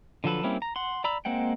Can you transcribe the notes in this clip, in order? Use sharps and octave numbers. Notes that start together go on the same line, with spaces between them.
D3 F3 F#3 A4 B4
G3 A#3 C4 C#4 E4
A#5
F#5 C6
D5 A#5 B5 E6
G#3 A#3 C4 F#5 G5